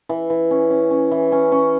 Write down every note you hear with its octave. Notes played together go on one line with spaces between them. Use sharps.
E3
E3
C#4
C#4
C#4
E3
C#4
C#4